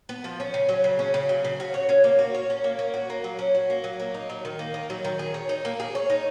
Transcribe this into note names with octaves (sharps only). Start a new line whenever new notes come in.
B3
F3
C#4
C#3
F#3
C#3
C#4
C#3
F#3
C#3
F#4
C#5
C#4
A#3
F#4
C#5
C#4
A#3
C#4
F#4
A#3
F#3
C#4
F#4
A#3
F#3
A#3
D#4
F#3
D#3
A#3
D#4
F#3
D#3
G#4
C#5
D#4
A#3
G#4
C#5
D#4